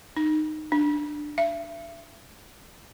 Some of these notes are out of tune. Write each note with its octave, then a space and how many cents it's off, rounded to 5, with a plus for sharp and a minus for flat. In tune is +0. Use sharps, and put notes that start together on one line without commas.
D#4 -15
D4 +15
E5 +40